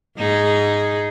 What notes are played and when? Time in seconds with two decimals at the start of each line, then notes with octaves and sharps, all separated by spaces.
0.18 G#2 D#4 G#4